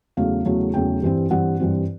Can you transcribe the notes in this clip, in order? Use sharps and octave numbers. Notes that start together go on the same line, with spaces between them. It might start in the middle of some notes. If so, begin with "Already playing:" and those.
E2 C#3 F#3 A3 F5
E2 C#3 F#3 A3
E2 C#3 F#3 A3 G5
G2 E3 G3 C4
G2 E3 G3 C4 F#5
G2 E3 G3 C4